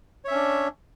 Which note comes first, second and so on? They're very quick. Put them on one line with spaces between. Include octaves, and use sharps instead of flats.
C#5 E5 C#4 D4